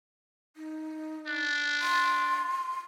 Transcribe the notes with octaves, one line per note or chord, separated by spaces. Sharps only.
D#4
D4
C6